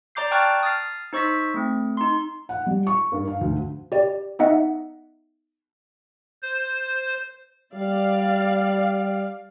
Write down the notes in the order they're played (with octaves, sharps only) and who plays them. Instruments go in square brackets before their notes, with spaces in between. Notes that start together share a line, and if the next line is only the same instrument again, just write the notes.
[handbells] D5 A#5 D6 G6 C7
G5 A5 C#6 F6 F#6 A6
D#6 F6 A6 C7
D#4 C5 C#6 E6 A#6 B6
A3 C4
D#4 C6
[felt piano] F#5
G3
C#6
G2
F5
D2
[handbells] G4 D5
B3 D#4 D#5 E5 F#5
[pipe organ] C5
[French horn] G3 [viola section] D5 F5